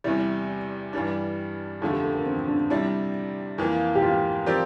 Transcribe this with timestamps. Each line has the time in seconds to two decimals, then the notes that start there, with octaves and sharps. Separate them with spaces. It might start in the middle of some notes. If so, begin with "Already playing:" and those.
0.04 E2 C3 G3 E4
0.93 G2 E3 G3 D4
1.81 F2 D3 F3 A3 F4
1.92 G4
2.04 A4
2.15 A#4
2.26 C4
2.48 D4
2.70 C3 G3 D4 E4
3.58 F2 E3 A#3 F4
3.95 G4
4.02 F4
4.46 F3 C4 G4 A#4 D5